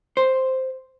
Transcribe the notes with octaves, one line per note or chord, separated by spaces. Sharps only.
C5